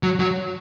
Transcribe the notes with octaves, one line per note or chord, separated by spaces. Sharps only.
F#3
F#3